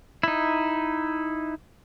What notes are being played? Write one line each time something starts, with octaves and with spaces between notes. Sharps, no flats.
D#4 E4